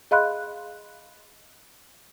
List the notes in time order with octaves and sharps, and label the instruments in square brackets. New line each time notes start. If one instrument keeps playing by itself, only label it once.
[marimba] G#4 D#5 F5 B5 C6 F#6